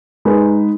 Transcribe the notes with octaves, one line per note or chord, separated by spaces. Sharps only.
G#3 D#4 G#4 B4